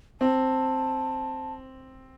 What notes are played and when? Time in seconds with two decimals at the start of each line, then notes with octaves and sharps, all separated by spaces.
0.21 C4 A5